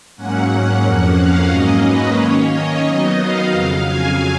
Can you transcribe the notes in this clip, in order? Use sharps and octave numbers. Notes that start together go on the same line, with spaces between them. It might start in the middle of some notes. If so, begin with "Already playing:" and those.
G#2 F#3 A#3 C#4 F#5
F#5
F2 F3 A#3 C#4
F5
G#2 F#3 A#3 C#4 D#5
B4
D#3 A#3 C#4 C#5
D#5
D#3 F#3 B3 D#4 D#5
F5
F2 C#3 F#3
G#5